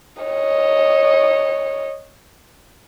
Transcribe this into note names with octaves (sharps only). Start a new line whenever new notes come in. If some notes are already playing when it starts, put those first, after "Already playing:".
C#5 D#5